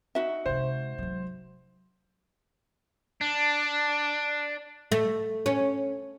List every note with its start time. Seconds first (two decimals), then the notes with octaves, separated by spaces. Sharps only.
0.15 D#4 F#4 E5
0.46 C3 G#3 C5
0.98 F#3 G#3
3.21 D4
4.92 A3
5.46 C#4